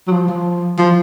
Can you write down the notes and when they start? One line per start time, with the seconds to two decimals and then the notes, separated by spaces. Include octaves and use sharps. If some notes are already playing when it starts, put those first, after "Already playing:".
0.07 F#3
0.12 F3
0.28 F3
0.78 F3